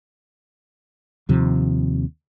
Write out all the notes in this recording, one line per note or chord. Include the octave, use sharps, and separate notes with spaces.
D#2 C3 F3